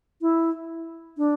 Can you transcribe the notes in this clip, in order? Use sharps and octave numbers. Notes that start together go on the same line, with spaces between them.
E4
D4